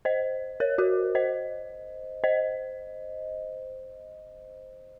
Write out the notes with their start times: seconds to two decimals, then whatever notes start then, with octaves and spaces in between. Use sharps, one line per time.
0.05 C5 D#5
0.60 A#4 C#5
0.78 F#4 A#4
1.15 C5 D#5
2.24 C5 D#5